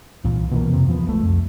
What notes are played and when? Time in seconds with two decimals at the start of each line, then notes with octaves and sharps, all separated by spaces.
0.24 C2 A#2 E3
0.51 B2 E3 A#3
0.70 F2 C3
0.87 E2 F3 A3 B3
1.06 E1 C2 G#3 A3
1.23 F2